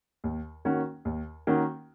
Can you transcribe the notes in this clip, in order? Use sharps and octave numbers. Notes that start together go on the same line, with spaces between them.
D#2
D#3 A#3 C#4 F#4
D#2
D#3 A#3 C#4 F#4